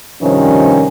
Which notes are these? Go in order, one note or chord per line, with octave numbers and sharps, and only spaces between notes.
G2 C3 D#3 F3 C#4